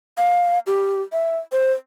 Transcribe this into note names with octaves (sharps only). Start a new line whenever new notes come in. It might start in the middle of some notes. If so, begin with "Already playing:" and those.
F5
G4
E5
C5